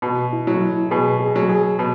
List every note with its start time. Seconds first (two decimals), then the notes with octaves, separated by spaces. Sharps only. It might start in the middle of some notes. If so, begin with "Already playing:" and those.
0.02 B2 F#4
0.33 E4
0.47 F#3
0.62 E4
0.91 B2 G#4
1.20 G#4
1.36 F#3
1.49 G#4
1.79 B2